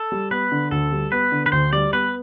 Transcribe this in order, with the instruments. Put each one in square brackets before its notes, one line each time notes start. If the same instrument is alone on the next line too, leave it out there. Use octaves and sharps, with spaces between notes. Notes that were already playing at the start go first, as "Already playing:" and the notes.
Already playing: [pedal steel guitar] A4
[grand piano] G3
[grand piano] B3 [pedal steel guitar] B4
[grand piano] D3
[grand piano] D2 [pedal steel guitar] A4
[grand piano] G3
[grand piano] B3 [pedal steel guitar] B4
[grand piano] D3
[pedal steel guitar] B4
[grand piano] D2 [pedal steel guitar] C5
[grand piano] G3 [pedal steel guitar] D5
[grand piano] B3 [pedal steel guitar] B4